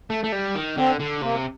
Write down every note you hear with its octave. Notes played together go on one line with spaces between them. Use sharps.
A3
A3
G3
D#3
D3 C4
D3
C3 A#3